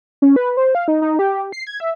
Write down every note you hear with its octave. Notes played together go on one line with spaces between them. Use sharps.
C#4
B4
C5
F5
D#4
D#4
G4
C7
G#6
E5